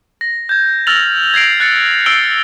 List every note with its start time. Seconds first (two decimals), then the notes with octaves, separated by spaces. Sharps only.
0.21 A#6
0.49 G6 G#6
0.87 E6 F6 A6 A#6 F7 F#7
1.34 G#6 A#6 C7 D7
1.60 F#6 A6 C#7
2.06 E6 C7 D7 G7